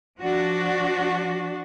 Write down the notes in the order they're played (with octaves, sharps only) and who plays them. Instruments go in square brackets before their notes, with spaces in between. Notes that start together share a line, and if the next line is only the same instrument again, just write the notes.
[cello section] F3 D4 F#4